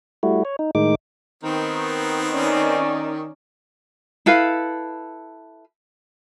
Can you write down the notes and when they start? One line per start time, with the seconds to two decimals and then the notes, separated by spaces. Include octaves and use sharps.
0.23 G3 A3 E4 F#4
0.45 C#5
0.59 D#4
0.75 A2 D#3 G#3 D#4 D6
1.43 D#3 B3 C4
2.31 C#4 D#4 D5
4.26 E4 A4 B4 F5